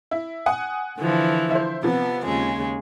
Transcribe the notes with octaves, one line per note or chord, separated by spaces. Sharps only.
E4
F#5 G#5 D#6
D3 E3 F3
E4 C5
C3 F3 B3
D#2 C#3 G#3